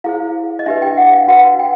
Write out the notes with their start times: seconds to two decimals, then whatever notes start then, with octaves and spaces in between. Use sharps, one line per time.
0.04 E4 G#4 C5 F5
0.59 D#5
0.66 D4 G4 B4 E5
0.82 G5
0.97 F#5
1.13 F5
1.28 F#4 B4 F#5
1.59 G5